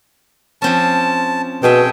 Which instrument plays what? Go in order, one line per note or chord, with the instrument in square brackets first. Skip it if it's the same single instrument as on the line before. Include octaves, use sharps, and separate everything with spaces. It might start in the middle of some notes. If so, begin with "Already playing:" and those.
[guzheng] F3 C4 C#4 [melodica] A5
[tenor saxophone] B2 [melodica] G#4 G5 [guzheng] A4 D#5 E5